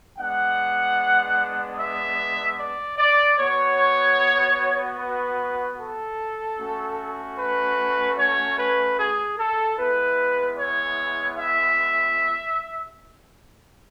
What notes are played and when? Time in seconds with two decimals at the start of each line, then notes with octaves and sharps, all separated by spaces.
0.17 G#3 B3 D4 F#5
1.77 E5
2.57 D5
2.97 D5
3.38 B3 F#4 C#5
4.98 B4
5.78 A4
6.58 A3 C#4 F#4
7.37 B4
8.17 C#5
8.57 B4
8.97 G#4
9.38 A4
9.78 G#3 B3 E4 B4
10.57 C#5
11.37 E5